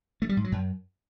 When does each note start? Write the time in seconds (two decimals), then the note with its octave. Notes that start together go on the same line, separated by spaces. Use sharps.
0.22 A3
0.29 G3
0.37 G#2
0.44 F#3
0.52 F#2